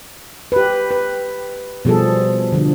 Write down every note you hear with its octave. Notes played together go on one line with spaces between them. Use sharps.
G4 B4
B4
B2 F3 G3 G#4 A4
D3 F3